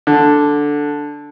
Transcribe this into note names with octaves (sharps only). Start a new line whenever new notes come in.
D3